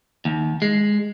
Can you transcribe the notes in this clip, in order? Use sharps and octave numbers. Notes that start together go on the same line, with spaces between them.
D#2
G#3